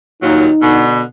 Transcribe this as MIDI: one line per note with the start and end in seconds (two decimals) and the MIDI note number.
0.23 0.48 39
0.23 0.48 46
0.23 0.48 54
0.23 0.85 63
0.62 1.01 47
0.62 1.01 50